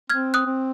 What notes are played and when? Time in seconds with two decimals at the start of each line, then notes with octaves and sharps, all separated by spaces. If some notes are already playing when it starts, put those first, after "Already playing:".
0.10 C4 F6 G#6
0.34 D#6 F#6
0.46 C4